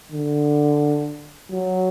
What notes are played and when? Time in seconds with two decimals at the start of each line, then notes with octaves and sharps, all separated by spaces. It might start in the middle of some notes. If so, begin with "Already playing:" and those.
0.12 D3
1.51 F#3